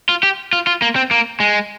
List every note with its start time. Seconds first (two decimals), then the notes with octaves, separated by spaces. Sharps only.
0.09 F4
0.23 G4
0.53 F4
0.67 F4
0.82 A#3
0.96 C4
1.11 A#3
1.40 G#3